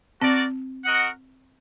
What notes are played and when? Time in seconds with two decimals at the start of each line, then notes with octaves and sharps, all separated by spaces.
0.20 C4 F#4 A#4 D5
0.85 F#4 A#4 D#5 F#5